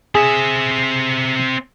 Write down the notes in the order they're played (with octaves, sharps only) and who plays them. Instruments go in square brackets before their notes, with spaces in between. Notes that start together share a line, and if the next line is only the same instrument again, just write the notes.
[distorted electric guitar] C4 E5 [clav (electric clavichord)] G#4